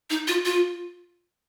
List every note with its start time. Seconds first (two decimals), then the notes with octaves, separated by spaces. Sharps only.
0.10 D#4
0.28 F4
0.45 F4